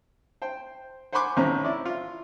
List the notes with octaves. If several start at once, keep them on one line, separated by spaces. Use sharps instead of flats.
C5 G5
C5 F#5 G#5 B5 C6 D6
A1 D#3 C4 C#4 C5 A#5
E4 D5
F4